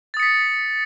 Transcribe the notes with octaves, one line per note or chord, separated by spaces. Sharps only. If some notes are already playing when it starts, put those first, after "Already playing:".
D#6 A6 B6 C#7